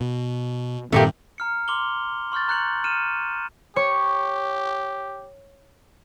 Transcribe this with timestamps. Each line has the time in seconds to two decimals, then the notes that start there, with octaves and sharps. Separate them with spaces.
0.01 B2
0.92 G2 A#2 D#3 A3 A#3 C4 G4
1.38 A#5 F6 C#7
1.68 C6 D6 F7 G7
2.32 C6 C#6 F6 G6 A6
2.48 A#5 F#6 G6 C#7 F#7
2.84 F6 C#7 D#7 E7
3.76 G4 C#5 C#6